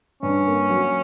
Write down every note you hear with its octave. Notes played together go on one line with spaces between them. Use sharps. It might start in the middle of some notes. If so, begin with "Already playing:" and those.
G2 C#4
A#3
F#3